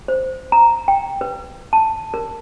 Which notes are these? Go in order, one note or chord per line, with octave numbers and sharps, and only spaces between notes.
C5
A#5
G5
B4
A5
A#4